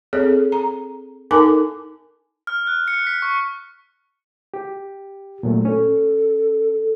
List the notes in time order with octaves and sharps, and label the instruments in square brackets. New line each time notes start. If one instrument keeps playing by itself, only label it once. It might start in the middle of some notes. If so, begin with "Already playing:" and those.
[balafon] C4 G#4 A4 C#5
A#5
D#4 A4 A#4 G#5 A5 D6
[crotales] F6
F#6
C#7
B6
C#6
[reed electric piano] G4
A#2 F#3 A3
[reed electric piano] C#4 [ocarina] A4